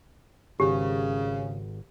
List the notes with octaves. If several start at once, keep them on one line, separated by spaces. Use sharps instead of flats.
G#1 C#3 G4